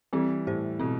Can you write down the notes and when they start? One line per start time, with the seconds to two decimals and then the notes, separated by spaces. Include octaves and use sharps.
0.13 E3 G3 C4
0.47 A2 G4 C5
0.80 B2 C4